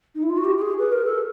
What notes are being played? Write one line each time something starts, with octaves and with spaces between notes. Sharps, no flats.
D#4
E4
F4
F#4
G4
G4
G#4
B4
A#4
A4